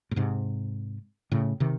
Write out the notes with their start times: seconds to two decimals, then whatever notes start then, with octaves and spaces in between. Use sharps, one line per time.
0.11 A2
0.16 G#2 C3
1.32 A2 C#3
1.60 C3 D#3